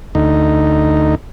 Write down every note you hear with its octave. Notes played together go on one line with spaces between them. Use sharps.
D2 D#4